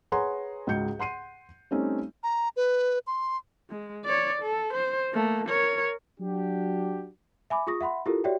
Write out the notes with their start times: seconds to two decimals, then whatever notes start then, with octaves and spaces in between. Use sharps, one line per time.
0.12 G#4 B4 C#5 F#5 A#5 C6
0.67 C#2 G#2 F#4 G6 C#7
0.99 F#5 C6 C7 D#7
1.71 G3 A3 C4 C#4 D#4
2.23 A#5
2.57 B4
3.07 C6
3.70 G#3
4.05 C#5 D5
4.43 A4
4.74 C5
5.12 A3 A#3
5.48 A#4 C#5
6.19 F#3 D4 F#4 G4
7.50 E5 G#5 B5 D6
7.67 F4 G#4 C#6 D#6 A#6
7.81 E5 F#5 B5 C6
8.06 E4 F4 G4 A4 A#4
8.24 F#4 G4 C#5 D5 E5 G5